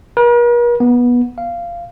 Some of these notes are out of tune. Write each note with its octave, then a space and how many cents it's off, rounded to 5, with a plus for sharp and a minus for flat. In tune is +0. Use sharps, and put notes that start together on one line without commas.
A#4 +45
B3 -20
F5 -15